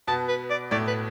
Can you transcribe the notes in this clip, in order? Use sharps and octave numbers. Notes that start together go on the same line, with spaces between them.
B2 B3 A5
B4
D5
A2 A3 D5
B4